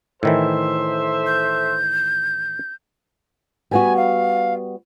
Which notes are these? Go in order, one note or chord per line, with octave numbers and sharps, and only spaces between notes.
A2 D#3 E3 A4 C5 E5
G6
G3 B3 F#4 G#5
F5